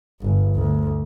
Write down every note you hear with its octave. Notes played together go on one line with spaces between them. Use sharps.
G1
D2